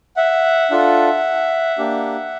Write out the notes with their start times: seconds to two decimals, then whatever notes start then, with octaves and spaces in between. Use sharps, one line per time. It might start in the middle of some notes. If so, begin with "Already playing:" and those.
0.16 E5 F#5
0.71 D4 F4 A4
1.78 A#3 D4 G4